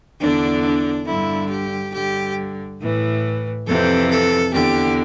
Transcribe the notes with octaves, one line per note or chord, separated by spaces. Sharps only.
E2 D3 D4
D4
G2 D3 E4
G4
G2 D3 G4
A2 E3
F2 C3 E3 A4
A4
E2 D3 G4